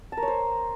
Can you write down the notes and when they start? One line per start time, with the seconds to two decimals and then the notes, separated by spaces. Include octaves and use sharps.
0.12 A5
0.17 A#4
0.23 C#5
0.28 C5